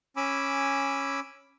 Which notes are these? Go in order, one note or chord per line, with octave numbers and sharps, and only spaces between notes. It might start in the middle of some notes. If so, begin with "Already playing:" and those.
C#4 G#5 B5 D6 E6